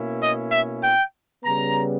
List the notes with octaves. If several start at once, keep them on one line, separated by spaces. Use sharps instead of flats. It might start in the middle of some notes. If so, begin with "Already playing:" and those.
Already playing: B2 A#3 C#4 E4
D#5
E5
G5
C#3 G3 B3 A#5